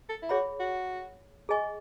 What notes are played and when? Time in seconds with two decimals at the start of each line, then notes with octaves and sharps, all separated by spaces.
0.09 A4
0.22 E4
0.29 F#4 G#4 C#5 E5 B5
0.59 F#4
1.49 G#4 D#5 G#5 C#6